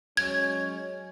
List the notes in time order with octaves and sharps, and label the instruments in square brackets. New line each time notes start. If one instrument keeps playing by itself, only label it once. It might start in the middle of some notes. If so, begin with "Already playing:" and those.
[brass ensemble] F#3 G#3 C#4 [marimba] G#6